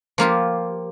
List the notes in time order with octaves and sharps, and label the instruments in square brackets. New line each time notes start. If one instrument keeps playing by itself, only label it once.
[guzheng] F3 A#3 F4 G4